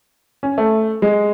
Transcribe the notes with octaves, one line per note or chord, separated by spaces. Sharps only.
C#4
A3
G#3